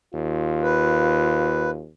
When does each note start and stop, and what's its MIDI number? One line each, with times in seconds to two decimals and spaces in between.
0.14 1.88 39
0.14 1.83 65
0.63 1.71 71